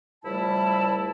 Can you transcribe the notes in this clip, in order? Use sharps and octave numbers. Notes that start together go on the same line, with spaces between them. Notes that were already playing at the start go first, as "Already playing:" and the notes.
C#2 F3 G3 A3 E4 A5